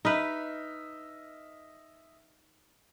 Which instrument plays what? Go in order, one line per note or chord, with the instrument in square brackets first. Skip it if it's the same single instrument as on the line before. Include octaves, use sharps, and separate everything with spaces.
[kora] D#4 B4 [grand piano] D#5 E5 F6